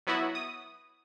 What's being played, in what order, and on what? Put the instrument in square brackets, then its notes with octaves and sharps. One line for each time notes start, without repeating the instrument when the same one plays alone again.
[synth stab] F#3 B3 E4 F#4
D#6